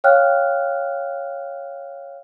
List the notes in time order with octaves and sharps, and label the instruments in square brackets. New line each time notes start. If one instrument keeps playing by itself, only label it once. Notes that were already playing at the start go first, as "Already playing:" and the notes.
[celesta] C#5 F5 G5 F6 F#6